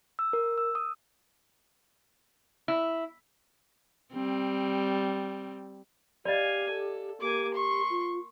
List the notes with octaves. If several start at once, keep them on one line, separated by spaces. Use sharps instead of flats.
E6
A#4
E6
D#6
E4
G3 C4
G4 D5 D#5 F5 G#5
A4
A#3 G4 G#5 D6
C6 C#6
F4